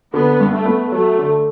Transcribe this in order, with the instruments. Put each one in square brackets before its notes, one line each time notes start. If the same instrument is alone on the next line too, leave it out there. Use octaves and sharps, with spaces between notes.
[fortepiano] D3 [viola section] B3
[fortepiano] G2
[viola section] A3
[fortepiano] B3
[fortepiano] F#3 [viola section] A3
[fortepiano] D3